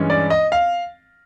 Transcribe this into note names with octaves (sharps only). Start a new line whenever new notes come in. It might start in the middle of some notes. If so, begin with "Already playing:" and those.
Already playing: G2 E3 G#3 C#4
D5
D#5
F5